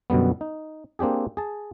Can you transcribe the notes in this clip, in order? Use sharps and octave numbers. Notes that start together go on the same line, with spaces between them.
F#2 B2 D3 G3 B3
D#4
A#3 C4 D4 G4 G#4
G#4 A5